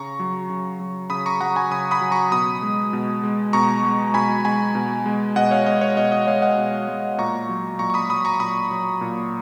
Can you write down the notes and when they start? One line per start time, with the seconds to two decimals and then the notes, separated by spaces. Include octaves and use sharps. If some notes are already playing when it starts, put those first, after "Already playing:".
Already playing: C#3 A#5 C#6
0.19 F#3
0.49 C#3
0.80 F#3
1.10 C#3 B5 D#6
1.26 A#5 C#6
1.41 F#3 F#5 A#5
1.56 G#5 B5
1.71 C#3 B5 D#6
1.91 B5 D#6
2.01 F#3
2.11 A#5 C#6
2.32 B2 B5 D#6
2.62 G#3
2.93 B2
3.23 G#3
3.53 B2 A#5 C#6
3.84 G#3
4.14 B2 G#5 B5
4.45 G#3 G#5 B5
4.75 B2
5.06 G#3
5.36 B2 D#5 F#5
5.51 C#5 F5
5.66 G#3 D#5
5.81 C#5
5.97 B2 D#5
6.12 D#5
6.27 G#3 C#5 F5
6.42 D#5 F#5
6.58 B2
6.88 G#3
7.18 A#2 A#5 C#6
7.49 F#3
7.79 A#2 A#5 C#6
7.90 C#6
7.94 B5 D#6
8.10 F#3 B5 D#6
8.25 A#5 C#6
8.40 A#2 B5 D#6
8.71 F#3
9.01 A#2